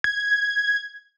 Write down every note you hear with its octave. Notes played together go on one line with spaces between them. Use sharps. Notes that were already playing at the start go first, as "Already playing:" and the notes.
G#6